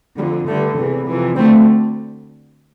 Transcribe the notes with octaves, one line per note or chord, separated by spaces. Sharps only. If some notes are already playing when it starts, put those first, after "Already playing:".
F2 D3 G3
G2 D3 A3
E2 C3 E3
F2 C3 E3
D2 D3 A3 C4